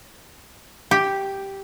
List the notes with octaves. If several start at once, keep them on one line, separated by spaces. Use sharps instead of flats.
G4